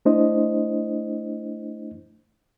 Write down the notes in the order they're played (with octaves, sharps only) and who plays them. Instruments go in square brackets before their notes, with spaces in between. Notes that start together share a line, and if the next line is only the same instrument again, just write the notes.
[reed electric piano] A3 D4 E4 C5 D#5